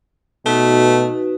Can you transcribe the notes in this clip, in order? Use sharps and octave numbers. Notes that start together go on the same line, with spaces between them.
B2 A3 D#4 F#4 B4